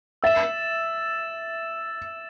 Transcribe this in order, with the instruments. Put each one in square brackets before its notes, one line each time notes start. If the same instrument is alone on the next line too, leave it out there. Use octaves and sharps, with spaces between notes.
[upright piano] E5 [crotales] E6 A6 E7